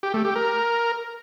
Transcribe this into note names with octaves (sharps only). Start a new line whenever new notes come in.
G4
A3
G4
A#4